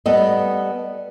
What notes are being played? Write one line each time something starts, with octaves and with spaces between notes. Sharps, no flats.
G3 B3 A4 D#5